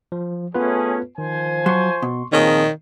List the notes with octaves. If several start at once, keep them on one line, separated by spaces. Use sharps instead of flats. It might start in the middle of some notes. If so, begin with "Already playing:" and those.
F3
A3 B3 C#4 F4 G#4 B4
D#3 F3 C5 G#5
F#3 C6 C#6
B2
A#2 D#3 F3 C4 D#4 G#4 C#5